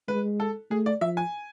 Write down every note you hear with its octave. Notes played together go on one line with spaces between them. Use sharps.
G#3 B4
A4
A3 G#4
D5
F3 E5
G#5